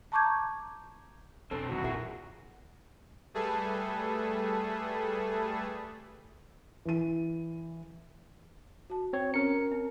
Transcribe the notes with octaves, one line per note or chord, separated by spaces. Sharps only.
A5 A#5 C#6 D6 G6 G#6
F2 B2 C4 D4 A4 C5
E2 G2 A#2 D#3 F#4
A#2 F3 E4 G#4 A#4 E5
G3 A3 G#4 A4 B4
E3 D#7
F#4 A5
C4 C#5
C#4 A#4 C#5 C#7
C4